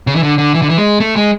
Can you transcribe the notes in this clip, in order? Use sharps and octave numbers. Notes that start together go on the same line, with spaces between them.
C#3
E3
D3
D3
E3
D3
E3
G#3
A3
G#3